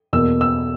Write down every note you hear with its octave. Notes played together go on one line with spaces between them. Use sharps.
E2 B2 A#3 E6
E6